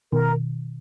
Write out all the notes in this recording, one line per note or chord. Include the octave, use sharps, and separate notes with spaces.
B2 D#3 A#4